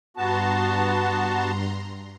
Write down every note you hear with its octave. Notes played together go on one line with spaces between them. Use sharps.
G2 B3 F#4 A5 A#5 C6